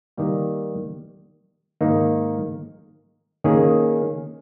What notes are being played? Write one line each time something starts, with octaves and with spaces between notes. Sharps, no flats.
D#3 G3 A#3
G#2 D#3 A#3 D#4
D#3 A#3 C#4 G#4